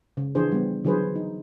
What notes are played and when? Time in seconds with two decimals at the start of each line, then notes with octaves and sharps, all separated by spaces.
0.17 C#3
0.35 E3 F3 D4 G#4 C5
0.52 G3 B3
0.85 D3 E3 F#3 G#4 B4 C5
1.15 D#4